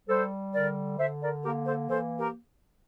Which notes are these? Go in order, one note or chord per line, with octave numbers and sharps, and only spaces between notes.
G3 A4 C5
D3 A#4 D5
D3 C5 E5
A#4 D5
A#3 G4 A#4
A4 C5
E3 A4 C5
G4 A#4